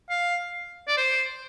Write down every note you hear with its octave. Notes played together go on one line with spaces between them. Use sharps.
F5
D5
C5